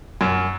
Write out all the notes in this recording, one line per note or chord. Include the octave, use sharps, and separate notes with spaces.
F#2